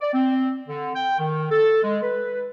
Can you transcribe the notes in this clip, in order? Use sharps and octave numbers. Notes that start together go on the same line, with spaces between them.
D5
C4
D3
G5
D#3
A4
G#3
B4